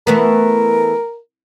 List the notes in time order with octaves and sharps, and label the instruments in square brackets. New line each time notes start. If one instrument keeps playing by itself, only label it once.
[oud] E3 A3 B3 [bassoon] A#4